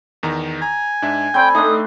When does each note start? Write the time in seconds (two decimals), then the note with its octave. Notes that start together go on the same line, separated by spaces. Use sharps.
0.23 E2 D#3 A#5
0.62 G#5 A#5
1.02 G#2 D4 E5
1.34 C4 D5 G5 B5 G6
1.55 A3 D4 D#4 D#6